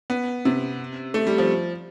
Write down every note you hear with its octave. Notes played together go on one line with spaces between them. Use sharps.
B3
C3
A3
G3
F3